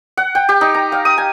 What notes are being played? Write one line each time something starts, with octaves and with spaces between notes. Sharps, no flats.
F#5
G5
G4
D#4
A#5
F5
D#6
G#5